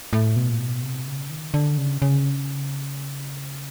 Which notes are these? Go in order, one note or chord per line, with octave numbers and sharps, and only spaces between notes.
A2
B2
A#2
B2
C3
C#3
D#3
D3
C#3
C#3